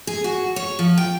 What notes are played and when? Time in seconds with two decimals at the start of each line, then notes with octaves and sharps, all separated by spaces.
0.07 G#4
0.24 F#4
0.56 C#5
0.79 F3
0.98 G5